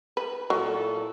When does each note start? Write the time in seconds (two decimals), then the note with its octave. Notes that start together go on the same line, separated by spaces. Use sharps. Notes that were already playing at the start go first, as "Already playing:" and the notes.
0.17 B4
0.50 A#2 F#3 E4 A4